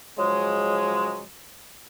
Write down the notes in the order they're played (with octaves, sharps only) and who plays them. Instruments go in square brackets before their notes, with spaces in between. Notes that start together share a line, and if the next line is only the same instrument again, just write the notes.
[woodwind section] C#3 F3 F#3 G#3